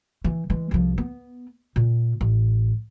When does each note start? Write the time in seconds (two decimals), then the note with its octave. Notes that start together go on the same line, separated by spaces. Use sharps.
0.24 E3
0.50 E3 G#3
0.71 C2 F3
0.98 B3
1.76 A#2
2.21 A1